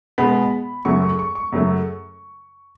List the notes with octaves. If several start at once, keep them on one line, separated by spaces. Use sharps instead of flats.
B2 G#3 B3 B5
F#2 C#3 F#3 A3 C#6
C#6
C#6
C#6
F#2 C#3 F#3 A3